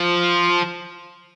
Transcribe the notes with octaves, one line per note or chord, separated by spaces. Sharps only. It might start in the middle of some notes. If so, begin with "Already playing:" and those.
Already playing: F3